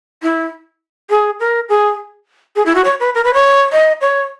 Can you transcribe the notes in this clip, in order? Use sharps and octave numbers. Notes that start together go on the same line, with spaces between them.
E4
G#4
A#4
G#4
G#4
E4
F#4
C#5
B4
A#4
B4
C#5
D#5
C#5